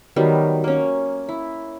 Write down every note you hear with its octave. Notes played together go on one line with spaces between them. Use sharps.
D#3 F#3 G3 B3
A#3 C#4
E4